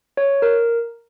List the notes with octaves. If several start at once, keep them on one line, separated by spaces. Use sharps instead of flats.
C#5
A#4